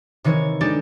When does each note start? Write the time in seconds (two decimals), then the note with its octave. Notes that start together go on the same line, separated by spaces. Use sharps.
0.24 C3 D#3 E3 C#5 G#6
0.61 G#3 D4 D#4 G4 A4 D5